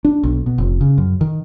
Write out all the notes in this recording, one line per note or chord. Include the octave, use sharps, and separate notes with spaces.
D4
B1
B2
F1
C#3
F#2
D#3